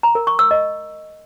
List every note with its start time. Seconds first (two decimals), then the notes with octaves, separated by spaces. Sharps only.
0.03 A#5
0.15 A#4
0.27 C#6
0.39 E6
0.51 D#5